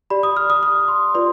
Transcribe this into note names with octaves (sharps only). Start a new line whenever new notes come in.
G4 D5 B5
D#6
F6
D#6
D#6
C6
F4 B4 D5 C6